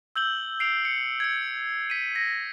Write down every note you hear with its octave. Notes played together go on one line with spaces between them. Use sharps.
E6 G6 F#7 G7
C7 D7 F7
C#7
G#6 C#7
B6 D#7
A#6